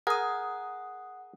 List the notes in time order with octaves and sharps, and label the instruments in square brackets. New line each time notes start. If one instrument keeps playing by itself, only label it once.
[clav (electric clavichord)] G#4 A#4 [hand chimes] F#5 D#6